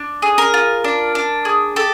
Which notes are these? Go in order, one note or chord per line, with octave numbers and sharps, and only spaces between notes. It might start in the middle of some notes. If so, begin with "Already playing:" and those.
Already playing: D4
G#4
A#4
F4
D4
D4
G#4
G4 A4